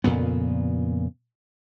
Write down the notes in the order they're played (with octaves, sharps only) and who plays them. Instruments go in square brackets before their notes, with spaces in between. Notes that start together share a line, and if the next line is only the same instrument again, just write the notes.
[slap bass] F2 A#2 C#3 B3